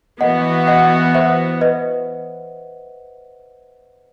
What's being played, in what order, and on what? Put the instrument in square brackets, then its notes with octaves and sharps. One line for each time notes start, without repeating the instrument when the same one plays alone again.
[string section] E3 B3 F#4 [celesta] D#5 F#5
[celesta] D#5 F#5
C5 E5
B4 D#5